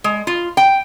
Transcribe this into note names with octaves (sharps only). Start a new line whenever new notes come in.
G#3
F4
G5